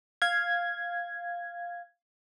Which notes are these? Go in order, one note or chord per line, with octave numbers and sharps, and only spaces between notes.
F5 G#6